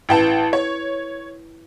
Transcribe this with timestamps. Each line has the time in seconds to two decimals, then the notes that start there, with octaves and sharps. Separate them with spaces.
0.09 A1 E4 B4 G5 A5
0.53 C#5